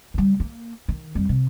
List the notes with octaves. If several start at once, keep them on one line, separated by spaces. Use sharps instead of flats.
C#3 G3
A#3
D#3
F2 G3
C3